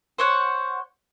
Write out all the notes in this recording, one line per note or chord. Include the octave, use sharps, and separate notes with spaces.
C5 C#5 F#5